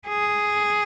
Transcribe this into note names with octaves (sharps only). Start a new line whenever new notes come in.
G#4